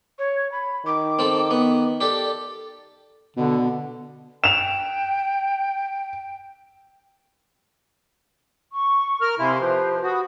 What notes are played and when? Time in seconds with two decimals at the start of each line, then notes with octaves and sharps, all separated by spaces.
0.19 C#5
0.52 B5
0.86 D#3 D6
1.19 C4 A4
1.51 B3
2.01 G4 A4 D5
3.37 B2 D3
4.44 G5 E7 F7
8.72 C#6
9.21 A#4 F6
9.39 C3 E4 F5 G#5 C6
9.59 F3 G4 B4 C5
10.03 F#4 B5 D#6